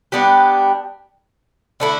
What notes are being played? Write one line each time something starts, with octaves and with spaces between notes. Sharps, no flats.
G3 B3 D4 G4
D3 A3 E4